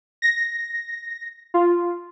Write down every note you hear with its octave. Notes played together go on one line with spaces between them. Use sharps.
A#6
F4